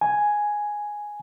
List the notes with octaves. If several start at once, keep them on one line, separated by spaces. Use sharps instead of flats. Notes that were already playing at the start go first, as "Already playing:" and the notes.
G#5